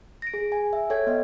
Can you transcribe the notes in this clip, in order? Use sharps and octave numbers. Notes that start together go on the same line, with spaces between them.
A#6 D7
G#4
G#5
E5
A4 C#5 G5 G#6
B3 D#5